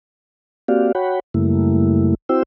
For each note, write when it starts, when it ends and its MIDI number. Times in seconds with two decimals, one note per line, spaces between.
0.68 0.92 58
0.68 0.92 60
0.68 0.92 66
0.68 0.92 67
0.68 0.92 74
0.68 0.92 77
0.95 1.20 66
0.95 1.20 73
0.95 1.20 78
0.95 1.20 79
0.95 1.20 83
1.34 2.15 42
1.34 2.15 49
1.34 2.15 55
1.34 2.15 57
1.34 2.15 58
1.34 2.15 64
2.29 2.43 60
2.29 2.43 64
2.29 2.43 66
2.29 2.43 72
2.29 2.43 79
2.29 2.43 88